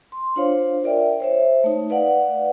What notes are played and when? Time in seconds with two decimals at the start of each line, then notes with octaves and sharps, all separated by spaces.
0.12 C6
0.36 D4 F4 C5 C#5 F5
0.83 F4 A#4 D5 E5 G5
1.20 C5 C#5 E5
1.64 A3 D#4
1.90 B4 D5 F5 F#5